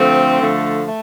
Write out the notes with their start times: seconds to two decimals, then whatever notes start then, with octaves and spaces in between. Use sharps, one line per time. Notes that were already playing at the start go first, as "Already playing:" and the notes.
Already playing: D3 F3 A3 C4
0.39 D3 F3 A3
0.85 A3